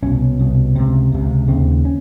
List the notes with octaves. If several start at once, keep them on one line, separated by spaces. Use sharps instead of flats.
C2 B2 C#4
C2 B2
C#2 C3 C4
C#2 C3
D#2 C#3 C4
C#4